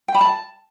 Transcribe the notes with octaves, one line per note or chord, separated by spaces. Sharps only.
G5
B5
A5